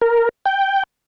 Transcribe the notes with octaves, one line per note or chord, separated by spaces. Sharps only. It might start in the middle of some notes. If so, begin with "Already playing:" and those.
A#4
G5